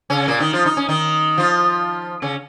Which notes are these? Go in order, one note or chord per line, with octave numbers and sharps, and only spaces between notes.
C#3 C#4
A#2 A#3
D#3 D#4
F3 F4
D#4
C#4
D#3 D#4
F3 F4
C#3 C#4